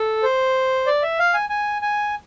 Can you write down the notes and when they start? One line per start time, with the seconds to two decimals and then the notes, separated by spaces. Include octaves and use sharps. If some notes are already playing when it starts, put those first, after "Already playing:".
Already playing: A4
0.23 C5
0.87 D5
1.02 E5
1.19 F5
1.34 G#5
1.49 G#5
1.82 G#5